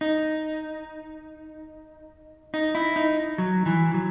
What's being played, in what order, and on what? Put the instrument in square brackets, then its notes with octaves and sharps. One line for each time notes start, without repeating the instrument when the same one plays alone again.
[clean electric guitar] D#4
D#4
E4
D#4
F#3
E3
F#3